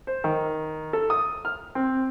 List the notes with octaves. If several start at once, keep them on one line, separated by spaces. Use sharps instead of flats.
C5
D#3
A4
D#6
F6
C4